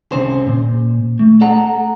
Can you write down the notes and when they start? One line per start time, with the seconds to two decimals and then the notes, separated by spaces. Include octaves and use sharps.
0.12 C2 C#3 C#4 C5
0.47 A#2
1.19 A3
1.41 A4 F#5 A#5